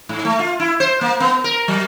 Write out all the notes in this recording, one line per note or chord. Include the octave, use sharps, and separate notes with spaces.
G#2
A3
F4
E4
C5
A#3
B3
A#4
F#3